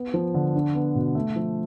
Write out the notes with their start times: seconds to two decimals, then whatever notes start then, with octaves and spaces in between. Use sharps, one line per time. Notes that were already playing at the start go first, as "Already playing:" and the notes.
Already playing: B3
0.14 F3
0.34 D3
0.55 D4
0.75 B3
0.95 B2
1.15 A3
1.36 F3